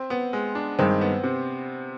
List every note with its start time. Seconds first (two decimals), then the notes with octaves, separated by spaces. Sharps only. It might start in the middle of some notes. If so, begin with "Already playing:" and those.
Already playing: C4
0.10 B3
0.33 G#3
0.55 D4
0.79 G2 D#3 G#3 C4
1.01 B3
1.24 C3